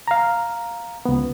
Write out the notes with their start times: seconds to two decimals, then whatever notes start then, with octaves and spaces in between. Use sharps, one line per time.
0.08 F5 A#5
1.05 C#2 B3